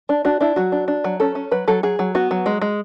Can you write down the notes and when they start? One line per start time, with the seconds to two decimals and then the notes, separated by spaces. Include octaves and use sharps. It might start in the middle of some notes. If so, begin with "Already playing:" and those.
0.09 D4
0.25 D4 F#4
0.41 D4 E4
0.56 F#3 F#4
0.72 D4
0.88 D4
1.04 F#3
1.20 C#4 A4
1.35 C#4
1.51 F#3 B4
1.68 F#3 A4
1.83 F#3 G#4
1.99 F#3
2.15 B3 F#4
2.31 F#3
2.46 G#3
2.61 G#3